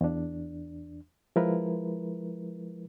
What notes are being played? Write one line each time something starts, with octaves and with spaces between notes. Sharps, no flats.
E2 D4
F3 G#3 E4 A#4 B4